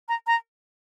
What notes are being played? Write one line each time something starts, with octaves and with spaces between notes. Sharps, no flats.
A#5
A#5